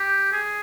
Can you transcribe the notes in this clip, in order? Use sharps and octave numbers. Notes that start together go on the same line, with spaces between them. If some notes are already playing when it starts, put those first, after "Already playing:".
Already playing: G4
G#4